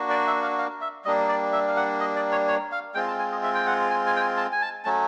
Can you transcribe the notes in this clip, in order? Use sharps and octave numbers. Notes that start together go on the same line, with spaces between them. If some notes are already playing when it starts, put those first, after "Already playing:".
Already playing: A#3 D4 F#4
D5
E5
F5
F5
E5
G3 A#3 D4 D#5
D5
E5
F5
F#5
D#5
D5
C#5
C#5
F5
G#3 C4 F4 G5
A5
G#5
D#5
E5
G5
F#5
G#5
G#5
G5
G#5
A5
G#5
A5
F#3 A3 C#4 A5